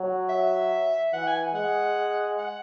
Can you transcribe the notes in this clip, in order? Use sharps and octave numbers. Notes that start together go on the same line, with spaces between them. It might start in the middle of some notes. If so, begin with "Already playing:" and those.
Already playing: F#3
E5
E3 F#5
G#5
G#3 F#5
F#5